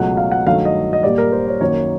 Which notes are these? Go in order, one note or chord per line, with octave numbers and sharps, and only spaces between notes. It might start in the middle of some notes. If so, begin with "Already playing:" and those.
Already playing: C#2 B2 F#3 A3 F#5
F5
F#5
G2 D#3 F#3 A3 F5
D#5
D#5
A#2 G3 A#3 D5
A#4
C5
C#5
F#2 D#3 F#3 A#3 C#5